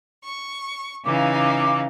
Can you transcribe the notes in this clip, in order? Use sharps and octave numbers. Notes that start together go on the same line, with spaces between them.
C#6
C#3 E3 D#4 F5 D6